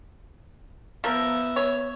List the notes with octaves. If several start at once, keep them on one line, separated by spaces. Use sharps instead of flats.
F3 B3 A#4 E5
C#5